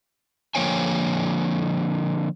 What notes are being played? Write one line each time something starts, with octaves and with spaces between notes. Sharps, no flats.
D3 F3 A#3 C#5 G5 G#5